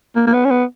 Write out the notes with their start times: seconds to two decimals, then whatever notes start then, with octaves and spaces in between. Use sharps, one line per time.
0.16 A#3
0.27 A#3
0.33 B3
0.45 C#4
0.50 B3